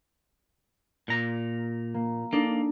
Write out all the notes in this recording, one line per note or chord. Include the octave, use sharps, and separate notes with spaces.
A#2 A#5
A#3
A#3 D4 D#4 A4